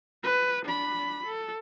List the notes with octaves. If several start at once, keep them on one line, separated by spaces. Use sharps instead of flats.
B4
D4 B5
A4